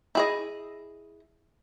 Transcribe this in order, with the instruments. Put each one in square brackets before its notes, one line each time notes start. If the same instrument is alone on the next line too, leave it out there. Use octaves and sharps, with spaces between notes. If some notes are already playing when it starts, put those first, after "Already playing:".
[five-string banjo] E4 G#4 D#5